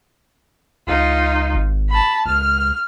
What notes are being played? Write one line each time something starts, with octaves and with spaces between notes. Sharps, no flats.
C#2 D#4 F4
G#1
A5 B5
C#2 F6